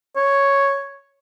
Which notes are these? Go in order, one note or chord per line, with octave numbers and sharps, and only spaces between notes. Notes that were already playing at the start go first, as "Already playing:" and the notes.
C#5